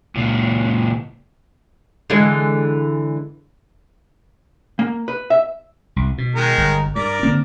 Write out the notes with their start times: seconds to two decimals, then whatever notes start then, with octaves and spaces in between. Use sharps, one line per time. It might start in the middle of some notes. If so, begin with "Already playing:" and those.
0.16 C#2 A#2
2.10 D3 E3 G#3
4.79 A#3
5.08 B4
5.30 E5
5.96 C2
6.18 B2
6.35 D#3 G#3 A#4
6.58 G1
6.95 G2 A#4 D5
7.23 D3 A#3 C4